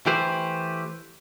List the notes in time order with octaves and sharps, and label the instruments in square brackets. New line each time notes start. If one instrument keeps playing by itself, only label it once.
[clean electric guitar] E3 A3 G4 B4 C5